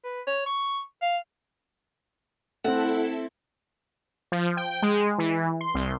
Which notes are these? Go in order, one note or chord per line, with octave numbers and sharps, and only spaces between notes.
B4
C#5
C#6
F5
A3 C4 E4 A4 F#5
F3
G5
G#3
E3
C6
C2